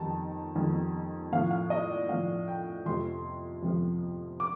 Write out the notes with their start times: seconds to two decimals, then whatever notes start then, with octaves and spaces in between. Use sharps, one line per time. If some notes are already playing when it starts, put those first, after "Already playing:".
Already playing: F2 D#3 G3 A5
0.55 F2 D#3 G3
1.32 A2 F3 F5
1.51 F5
1.70 D#5
1.90 D5
2.09 A2 F3 F5
2.48 G5
2.86 F2 C3 F3 C6
3.63 F2 C3 F3
4.40 D6